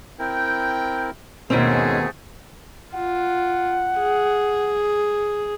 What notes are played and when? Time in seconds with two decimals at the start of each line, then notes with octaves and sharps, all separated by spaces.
0.19 C4 E4 A#4 G5
1.50 D#2 G#2 B2 G#3 A3 C4 C#4 G#4
2.94 F4 F#5
3.99 G#4